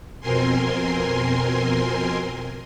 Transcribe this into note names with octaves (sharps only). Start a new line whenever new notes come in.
F2 B2 C4 A#4 G#5 C6